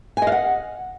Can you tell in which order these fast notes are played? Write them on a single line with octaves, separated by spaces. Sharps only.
G#5 D#5 F5 F#5